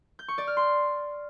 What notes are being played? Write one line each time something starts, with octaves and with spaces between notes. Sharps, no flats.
G6
C#6
D5
F6
C6